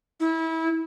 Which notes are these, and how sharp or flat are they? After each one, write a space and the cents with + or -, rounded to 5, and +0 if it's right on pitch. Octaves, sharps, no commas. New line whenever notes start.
E4 -25